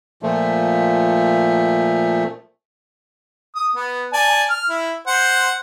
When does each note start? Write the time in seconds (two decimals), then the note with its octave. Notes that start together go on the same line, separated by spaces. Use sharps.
0.23 A#2 F3 A3
3.55 D#6
3.76 B3
4.13 D5 G#5 A5
4.50 F6
4.69 E4
5.07 C5 F#5